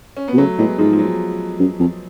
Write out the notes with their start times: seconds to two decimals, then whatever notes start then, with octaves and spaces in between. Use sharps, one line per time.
0.17 C#4
0.28 B3
0.34 B2
0.38 C#3 F#3 A3
0.58 A2 G#3 B3
0.78 G#2 F3 G#3
0.93 F3
0.99 F#3
1.60 F#2
1.80 F2